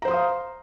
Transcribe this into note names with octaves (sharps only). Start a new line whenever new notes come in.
C5 F5 A#5 C6 D#6